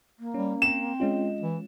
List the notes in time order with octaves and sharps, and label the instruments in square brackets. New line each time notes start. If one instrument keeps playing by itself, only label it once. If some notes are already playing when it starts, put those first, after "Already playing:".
[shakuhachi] A#3
[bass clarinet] G3 [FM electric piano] C#4
[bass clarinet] C4 [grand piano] E7
[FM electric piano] G#3 C#4 F4 [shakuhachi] D#5
[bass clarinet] E3